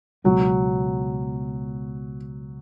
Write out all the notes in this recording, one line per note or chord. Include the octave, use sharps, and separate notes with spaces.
C#2 B2 F#3 G#3 B3